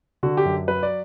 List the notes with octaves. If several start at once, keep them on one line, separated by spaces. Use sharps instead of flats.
D3 F#4
G4
F#2
F#3 B4
D5